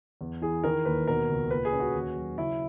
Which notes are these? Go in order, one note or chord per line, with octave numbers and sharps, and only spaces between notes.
E2
E3 G#4
D#3 A#4
D#2 B4
B2 A#4
C#2
A#2 B4
G#4
C#4
F#4
D#2
F#3
C#3 E4